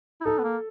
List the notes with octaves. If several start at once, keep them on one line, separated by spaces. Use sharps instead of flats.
E4
D#4 A4
B3
A#3